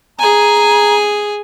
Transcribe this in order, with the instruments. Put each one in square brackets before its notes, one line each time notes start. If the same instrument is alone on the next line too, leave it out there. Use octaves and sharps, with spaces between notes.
[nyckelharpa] G#4 G#5 [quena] A#5